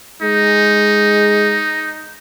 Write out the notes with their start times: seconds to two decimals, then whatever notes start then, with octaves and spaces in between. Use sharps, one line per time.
0.22 G#3 D#4